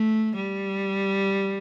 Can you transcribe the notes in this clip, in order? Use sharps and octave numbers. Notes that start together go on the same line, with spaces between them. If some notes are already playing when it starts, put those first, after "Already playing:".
Already playing: A3
G3